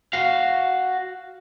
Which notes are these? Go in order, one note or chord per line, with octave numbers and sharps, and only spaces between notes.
F#4 F5